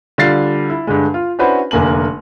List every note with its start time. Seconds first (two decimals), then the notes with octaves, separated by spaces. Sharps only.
0.18 D3 G3 F4 A6 C7
0.70 E4
0.87 G2 D3 G#3
1.14 F4
1.39 C#4 D4 E4 F#4 B4 C5
1.71 F1 D3 A#3 G#5 F#7